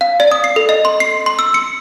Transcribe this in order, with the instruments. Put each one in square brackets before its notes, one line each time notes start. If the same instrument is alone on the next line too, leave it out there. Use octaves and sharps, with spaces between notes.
[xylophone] F5
D5
D#6
C7
A4
D#5
C6
C7
C6
E6
C#7